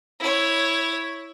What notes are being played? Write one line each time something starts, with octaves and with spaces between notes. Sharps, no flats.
E4 C#5